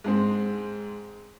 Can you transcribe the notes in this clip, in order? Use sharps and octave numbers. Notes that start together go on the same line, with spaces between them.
G#2 G#3 C4